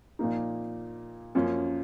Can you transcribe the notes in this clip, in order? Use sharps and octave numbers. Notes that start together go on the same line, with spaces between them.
A#2 F3 A#3 D#4
F#2 F3 A#3 C#4